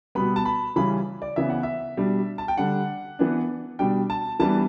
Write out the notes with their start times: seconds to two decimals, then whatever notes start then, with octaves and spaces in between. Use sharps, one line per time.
0.15 B2 G3 B3 B5
0.36 A5
0.45 B5
0.76 C#3 E3 G3 C#4 B5
1.22 D5
1.36 C#3 E3 B3 E5
1.50 F#5
1.63 E5
1.97 B2 G3 D4
2.38 A5
2.48 G5
2.57 D3 G3 D4 F#5
3.19 E3 B3 D4
3.79 B2 G3 D4 G5
4.10 A5
4.40 E3 G3 B3 D4 A5